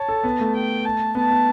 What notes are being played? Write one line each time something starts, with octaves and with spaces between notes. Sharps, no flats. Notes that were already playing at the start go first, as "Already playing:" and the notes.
Already playing: C#5 A5
A4
B3
A3
G5
A5
B3 A5
B3